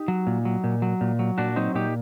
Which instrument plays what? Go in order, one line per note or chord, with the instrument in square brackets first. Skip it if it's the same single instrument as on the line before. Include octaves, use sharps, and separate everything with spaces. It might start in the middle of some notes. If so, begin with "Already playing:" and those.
Already playing: [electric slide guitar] D#4 G4
F#3
A#2
F#3
A#2
F#3
A#2
F#3
A#2 D4 F#4
F#3 C4 D#4
A#2 D#4 G4